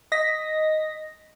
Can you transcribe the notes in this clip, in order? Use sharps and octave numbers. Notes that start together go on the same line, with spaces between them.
D#5 A#6 B6